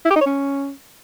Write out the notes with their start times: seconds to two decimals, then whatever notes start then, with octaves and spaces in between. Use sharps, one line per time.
0.05 E4
0.11 G4
0.16 D#4
0.21 C#5
0.26 C#4